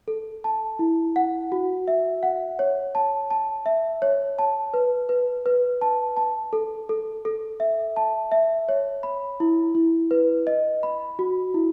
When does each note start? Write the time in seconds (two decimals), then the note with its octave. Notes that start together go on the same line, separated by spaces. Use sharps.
0.08 A4
0.44 A5
0.79 E4
1.16 F#5
1.52 F#4
1.88 E5
2.23 F#5
2.59 C#5
2.95 A5
3.30 A5
3.66 E5
4.02 C#5
4.39 A5
4.74 B4
5.09 B4
5.46 B4
5.81 A5
6.17 A5
6.53 A4
6.89 A4
7.25 A4
7.60 E5
7.96 A5
8.32 E5
8.69 C#5
9.03 B5
9.40 E4
9.75 E4
10.11 B4
10.47 D#5
10.83 B5
11.19 F#4
11.54 E4